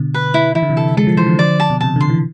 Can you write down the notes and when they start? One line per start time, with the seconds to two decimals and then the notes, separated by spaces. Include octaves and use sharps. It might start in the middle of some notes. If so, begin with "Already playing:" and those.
Already playing: B2 D3
0.14 B4
0.34 E4
0.55 E3 E4
0.62 D3
0.69 C3 E3
0.77 A4
0.97 G#3 A4
1.07 F3
1.17 E3 C5
1.26 D3 F3
1.39 D5
1.60 A5
1.70 B2
1.81 C3 A5
1.96 D3 C6
2.10 E3